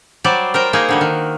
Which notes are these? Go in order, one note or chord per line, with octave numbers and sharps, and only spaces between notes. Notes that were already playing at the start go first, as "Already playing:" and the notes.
F#3 G3 C5 D5
A#4 C5 G5
A#3 D#4 G#4 A#4
D3 G3 F#4
D#3